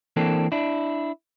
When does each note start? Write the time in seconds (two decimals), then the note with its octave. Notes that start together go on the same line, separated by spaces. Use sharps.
0.16 E3 A#3 C4 D4 A4
0.52 D4 E4